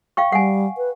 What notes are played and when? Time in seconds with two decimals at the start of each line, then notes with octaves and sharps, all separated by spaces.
0.17 F5 G5 C#6
0.32 G3 F#5 G#5
0.77 B4